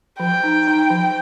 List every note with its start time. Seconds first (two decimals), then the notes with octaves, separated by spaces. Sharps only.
0.20 F3 G5
0.44 D#4
0.67 D#4
0.90 F3